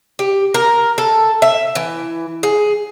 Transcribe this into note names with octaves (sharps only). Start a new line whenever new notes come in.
G4
A#4
A4
E5
E3
G#4